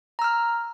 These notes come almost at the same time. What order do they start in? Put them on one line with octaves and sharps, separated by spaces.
A#5 E6 F6